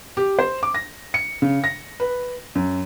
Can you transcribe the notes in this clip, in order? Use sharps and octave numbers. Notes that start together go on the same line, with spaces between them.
G4
C5
D6
A#6
C#7
C#3
A#6
B4
F#2